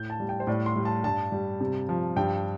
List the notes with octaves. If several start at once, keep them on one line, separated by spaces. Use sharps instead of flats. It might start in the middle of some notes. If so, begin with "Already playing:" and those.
Already playing: A2 G6
A5
G3
G5
C5
A2 D5
C6
G3
A5
G2 A5
G3
C3
F3
G2 G5